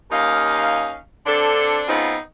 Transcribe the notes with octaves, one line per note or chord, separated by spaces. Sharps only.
D#2 C#4 D#4 F5
D3 C4 D4 A4
C#3 B3 C4 D#4 F4